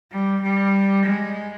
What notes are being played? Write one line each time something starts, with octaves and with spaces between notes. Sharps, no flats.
G3
G3
G#3